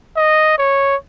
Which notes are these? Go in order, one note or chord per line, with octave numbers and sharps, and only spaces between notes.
D#5
C#5